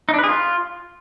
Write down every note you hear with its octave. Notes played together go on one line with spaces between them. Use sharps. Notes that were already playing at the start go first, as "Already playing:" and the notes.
D#4
D4
B4
G#4
F4